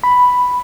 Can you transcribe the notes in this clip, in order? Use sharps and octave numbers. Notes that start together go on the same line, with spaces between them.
B5